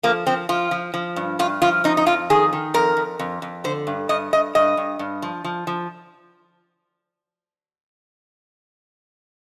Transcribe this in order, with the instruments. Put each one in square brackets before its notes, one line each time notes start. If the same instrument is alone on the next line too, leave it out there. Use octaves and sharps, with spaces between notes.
[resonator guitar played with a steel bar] F3 A#3
F3 C4
F3 F4
F3
F3
G2
G2 F4
F3 F4
F2 D#4
D#4
F2 F4
D#3 G#4
D#3
F2 A#4
F2
F2
F2
D3 C5
G2
G2 D#5
G2 D#5
G2 D#5
G2
G2
F3
F3
F3